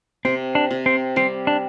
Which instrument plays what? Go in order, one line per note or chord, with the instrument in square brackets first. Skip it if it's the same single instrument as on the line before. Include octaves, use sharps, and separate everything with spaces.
[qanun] C3 [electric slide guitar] C4
[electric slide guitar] D4
[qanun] C3
[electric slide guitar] C4
[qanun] G3 [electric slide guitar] C4
[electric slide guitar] D4